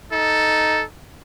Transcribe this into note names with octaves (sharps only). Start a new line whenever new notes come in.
D#4 A4